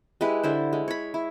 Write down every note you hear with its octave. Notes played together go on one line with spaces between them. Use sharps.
G#3 E4 G4 B4
D3 E4 C5
G#3
C#5 B5
E4